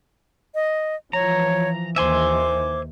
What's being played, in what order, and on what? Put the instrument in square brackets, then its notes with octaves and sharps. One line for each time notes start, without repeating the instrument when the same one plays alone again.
[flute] D#5
[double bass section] E3 F3 [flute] C#5 [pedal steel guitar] A#5
[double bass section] D#2 D#3 E3 [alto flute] C5 [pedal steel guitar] E5 G#5 C6 [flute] D6